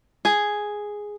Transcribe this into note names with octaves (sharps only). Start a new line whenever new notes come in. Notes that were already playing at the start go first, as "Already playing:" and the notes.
G#4